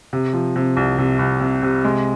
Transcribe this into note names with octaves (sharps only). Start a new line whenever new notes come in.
C3
F3
C3
C2
C3
C2
C3
C3
G#3